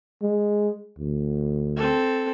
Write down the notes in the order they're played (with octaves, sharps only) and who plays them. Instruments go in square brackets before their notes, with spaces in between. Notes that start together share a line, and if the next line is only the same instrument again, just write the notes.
[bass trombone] G#3
D2
[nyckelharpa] C4 A4